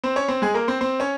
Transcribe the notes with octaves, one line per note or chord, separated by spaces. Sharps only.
C4 C5
C#4 C#5
C4 C5
G#3 G#4
A#3 A#4
C4 C5
C4 C5
C#4 C#5